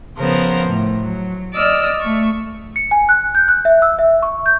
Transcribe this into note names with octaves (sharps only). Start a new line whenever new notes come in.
C#3 F3 B3 A#4 C5
A2
F#3
D5 D#5 E6 F6
A3 C#6
C#7
G#5
F#6
G6
F#6
E5
E6
E5
C#6
G6